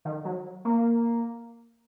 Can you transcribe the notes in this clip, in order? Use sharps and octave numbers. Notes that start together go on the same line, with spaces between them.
D#3
F#3
A#3